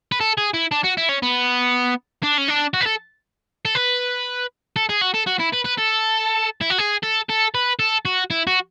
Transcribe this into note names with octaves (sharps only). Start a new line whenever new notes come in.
B4
A4
G#4
E4
D4
F#4
E4
C#4
B3
D4
C#4
D4
F#4
B4
A4
A4
B4
A4
G#4
F#4
A4
F#4
E4
B4
B4
A4
E4
F#4
G#4
A4
A4
B4
A4
F#4
E4
F#4